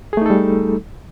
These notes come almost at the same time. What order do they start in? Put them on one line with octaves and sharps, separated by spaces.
G#4 A3 D#4 A4 G3